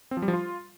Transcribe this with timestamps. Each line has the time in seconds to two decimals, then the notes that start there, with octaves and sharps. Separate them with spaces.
0.11 C4
0.17 F3
0.22 G3
0.28 F3
0.33 F4